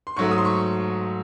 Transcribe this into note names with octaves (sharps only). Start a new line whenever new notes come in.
C6
G#2 F#3 A3 C#6
D#6
C6
C#6